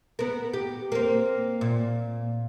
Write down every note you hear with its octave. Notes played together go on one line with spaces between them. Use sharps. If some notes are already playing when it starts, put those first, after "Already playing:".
B3 A#4
G4
A#3 C4
A#2